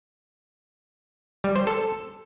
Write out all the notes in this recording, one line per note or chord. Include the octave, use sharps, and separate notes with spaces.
G3
C5
A4